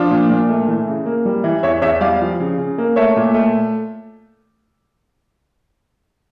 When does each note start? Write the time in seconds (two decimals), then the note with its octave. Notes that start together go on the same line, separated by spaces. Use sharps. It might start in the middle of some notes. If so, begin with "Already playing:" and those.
Already playing: F3 D4 F4
0.11 A#2
0.30 A#2
0.49 A3
0.68 E3
0.88 C#3
1.06 A#3
1.25 G3
1.44 E3
1.63 E2 C#5 E5
1.82 E2 C#5 E5
2.01 G3 D5 F5
2.21 F3
2.40 C#3
2.58 C#3
2.78 A#3
2.96 A3 C#5 E5
3.16 A#2
3.34 A3